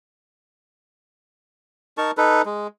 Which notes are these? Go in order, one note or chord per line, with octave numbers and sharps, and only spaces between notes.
D#4 A#4 A5 C#6
D#4 A4 B4
G#3